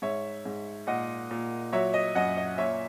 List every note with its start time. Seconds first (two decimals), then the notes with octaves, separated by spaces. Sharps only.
0.02 G#2 C#5 E5
0.45 G#2
0.87 A#2 D#5 F#5
1.31 A#2
1.73 F#3 C#5 E5
1.94 D#5
2.15 F#2 D#5 F#5
2.37 D#5
2.58 A#2 C#5 E5